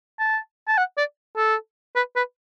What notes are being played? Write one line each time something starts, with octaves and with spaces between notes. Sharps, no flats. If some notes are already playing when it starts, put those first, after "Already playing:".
A5
A5
F#5
D5
A4
B4
B4